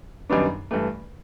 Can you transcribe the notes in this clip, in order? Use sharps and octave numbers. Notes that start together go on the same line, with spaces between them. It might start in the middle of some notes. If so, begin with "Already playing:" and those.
F#2 D#3 G3 B3 D4
G2 E3 A3